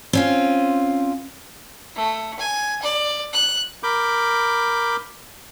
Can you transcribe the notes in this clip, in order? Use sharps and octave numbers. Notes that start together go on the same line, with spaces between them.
C4 C#4 F4
A3
G#5
D5
F#6
A#4 B5 D6 G6